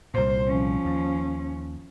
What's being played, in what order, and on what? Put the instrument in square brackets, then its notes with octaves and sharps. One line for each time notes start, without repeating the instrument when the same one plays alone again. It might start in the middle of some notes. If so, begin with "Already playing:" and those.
[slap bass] C2 A#2 [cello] C5
[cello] F3 C#4
[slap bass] D#2